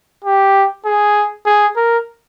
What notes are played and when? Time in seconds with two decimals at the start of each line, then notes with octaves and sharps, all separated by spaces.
0.24 G4
0.86 G#4
1.46 G#4
1.76 A#4